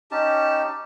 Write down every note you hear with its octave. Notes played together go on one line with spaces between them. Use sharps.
C#4 D#4 G4 A5